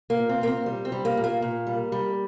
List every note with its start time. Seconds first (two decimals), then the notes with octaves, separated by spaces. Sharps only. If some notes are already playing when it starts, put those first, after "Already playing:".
0.10 A#3
0.17 A#2
0.29 C4
0.41 A#2 A#3
0.48 C4
0.66 G3
0.85 C4
0.92 G3
1.05 A#3
1.17 A#2
1.24 A#3
1.42 A#2
1.67 G3
1.92 G3